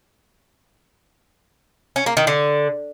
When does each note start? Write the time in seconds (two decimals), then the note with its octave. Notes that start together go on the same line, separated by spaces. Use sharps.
1.96 C#4
2.06 A#3
2.17 D#3
2.27 D3